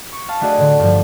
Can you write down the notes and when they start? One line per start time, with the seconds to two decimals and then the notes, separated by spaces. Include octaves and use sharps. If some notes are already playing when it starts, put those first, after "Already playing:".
0.12 C#6
0.29 F5 A5
0.41 A3 D4 F#4 G#4 D5 D#5
0.58 A2 D3
0.80 G2 F3